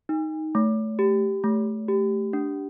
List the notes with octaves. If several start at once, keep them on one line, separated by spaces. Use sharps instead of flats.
D#4
A3
G4
A3
G4
D4